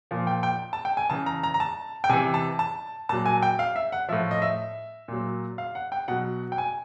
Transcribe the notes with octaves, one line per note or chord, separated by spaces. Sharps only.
A#2 F3
G5
G5
A5
G5
G#5
C#3 E3 A5
A#5
A#5
A#5
A5
G5
C3 E3 G#5
A5
A5
A#2 F#3 A5
G#5
G5
F5
E5
F#5
A2 F3 E5
D#5
E5
A#2 F#3
F5
F#5
G5
B2 F#3 F#5
G5
G#5